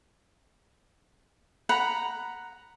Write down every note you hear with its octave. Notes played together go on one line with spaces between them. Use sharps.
F#5 A#5 B5